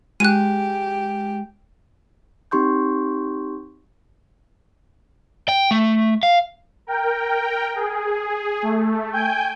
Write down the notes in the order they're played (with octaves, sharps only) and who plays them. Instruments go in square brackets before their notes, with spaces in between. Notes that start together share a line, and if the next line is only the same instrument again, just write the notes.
[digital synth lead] G#3 [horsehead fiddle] G4 [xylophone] F#6 D#7
[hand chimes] C4 D#4 G4 C6 C#6 G6
[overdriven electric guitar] G5
A3
F5
[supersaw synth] A#4 G5
G#4
A3
G5 G#5 G6